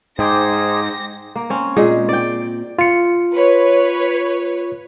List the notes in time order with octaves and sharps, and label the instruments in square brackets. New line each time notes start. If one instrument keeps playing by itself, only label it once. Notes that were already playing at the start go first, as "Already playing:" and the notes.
[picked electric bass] G#2 [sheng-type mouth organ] D#4 G#4 C5 [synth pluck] G5 D6 G6 [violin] A#6
[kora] A#3
C4 C#4
A#2 G#3 G#4
D5 G5
[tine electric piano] F4 C#7
[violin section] B4 C#5